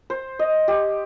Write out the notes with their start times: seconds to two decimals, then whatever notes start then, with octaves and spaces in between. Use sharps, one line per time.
0.10 C5
0.39 D#5
0.68 G4